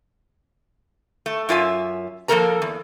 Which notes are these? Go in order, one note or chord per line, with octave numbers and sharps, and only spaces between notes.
A3
F#2 F4 E5 G#5
F3 A#3 B3 A4 A#4 A#5
E2